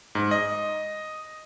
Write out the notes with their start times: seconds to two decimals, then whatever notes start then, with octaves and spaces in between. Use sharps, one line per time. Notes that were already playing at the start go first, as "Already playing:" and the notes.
0.15 G#2
0.31 D#5